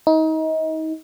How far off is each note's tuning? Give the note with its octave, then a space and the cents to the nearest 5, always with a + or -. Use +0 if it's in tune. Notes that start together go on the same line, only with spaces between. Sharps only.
D#4 +30